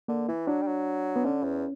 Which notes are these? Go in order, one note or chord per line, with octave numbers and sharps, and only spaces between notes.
D3 A#3
E3 E4
F#3 D4
G3
F#3
B3
D3 C#4
E2